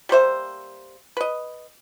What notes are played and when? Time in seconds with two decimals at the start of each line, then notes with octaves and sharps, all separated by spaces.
0.09 G3 A#3 C5 E5
1.17 B4 D#5